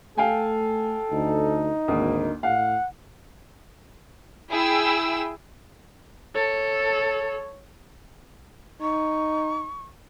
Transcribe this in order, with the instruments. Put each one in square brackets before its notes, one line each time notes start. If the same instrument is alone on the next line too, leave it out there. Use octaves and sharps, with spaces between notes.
[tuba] A3 [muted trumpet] A4 [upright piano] F5 G5 G#5
[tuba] D2 [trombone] D#4
[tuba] G#1 [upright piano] D2 A#3 D#6
[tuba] A2 [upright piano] F5 [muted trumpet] F#5
[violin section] E4 G#4 G5 E6
[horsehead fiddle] A4 [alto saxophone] C#5
[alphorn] D#4 [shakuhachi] C#6